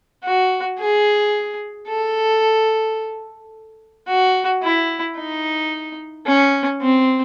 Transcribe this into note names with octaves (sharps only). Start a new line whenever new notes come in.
F#4
G#4
A4
F#4
E4
D#4
C#4
C4